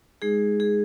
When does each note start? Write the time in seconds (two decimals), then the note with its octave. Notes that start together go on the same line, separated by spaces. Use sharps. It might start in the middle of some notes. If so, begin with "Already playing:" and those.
0.22 G#3 D#4 G#4
0.60 G#4